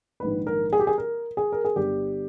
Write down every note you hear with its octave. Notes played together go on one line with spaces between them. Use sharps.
A#1 G#2 D#3 B4
A#4
G#4
G4
G#4
A#4
G#4
A#4
G#4
G1 G2 G3 G4